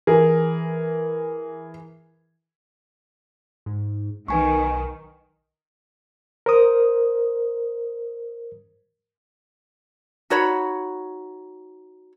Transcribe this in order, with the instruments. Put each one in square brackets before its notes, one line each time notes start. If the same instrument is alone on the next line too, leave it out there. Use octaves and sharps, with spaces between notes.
[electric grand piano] E3 A#4 [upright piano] G#4
[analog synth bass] G#2
[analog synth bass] B1 [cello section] D#3 [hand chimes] B4 G#5 C#6
[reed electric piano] A#4 C5 D#6
[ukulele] D#4 F#4 C#5 B5